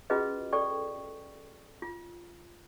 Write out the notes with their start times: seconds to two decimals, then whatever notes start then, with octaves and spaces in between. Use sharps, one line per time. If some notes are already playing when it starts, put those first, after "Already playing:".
0.10 C#4 F4 F#4 G#4 B4 D#5
0.53 A4 D5 G5 C#6
1.82 F4